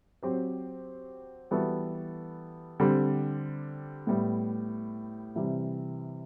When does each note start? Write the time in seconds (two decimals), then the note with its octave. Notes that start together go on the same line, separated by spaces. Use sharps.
0.23 F#3 C4 G4 C5
1.51 E3 G3 B3 F#4 A4
2.80 D3 G3 C4 G4
4.07 A2 G3 B3
5.35 C3 E3 G3